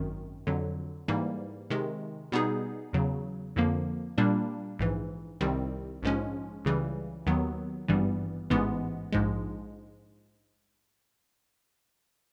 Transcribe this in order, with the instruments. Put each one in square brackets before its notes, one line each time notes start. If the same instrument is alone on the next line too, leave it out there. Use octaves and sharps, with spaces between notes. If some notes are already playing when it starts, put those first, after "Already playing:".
Already playing: [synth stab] G#1 F#2 D#3
F2 D3 F#3
G#2 E3 G3 A#3
C3 D#3 G#3
B2 G3 B3 D#4 G#4
E2 C#3 F#3
F2 D3 F3 A#3
A#2 G3 A#3 D4
A#1 G#2 E3
C2 C3 D#3 G3 C4
A#1 G#2 F3 G#3 C#4
C#2 C#3 E3 G3
D#2 D#3 F#3 B3
G#1 G2 E3 G3 B3
A1 G#2 E3 G#3 B3
A#1 G#2 F3 G#3